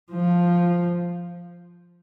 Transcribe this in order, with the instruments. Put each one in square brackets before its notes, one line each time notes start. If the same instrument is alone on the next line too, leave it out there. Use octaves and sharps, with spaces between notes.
[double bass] F3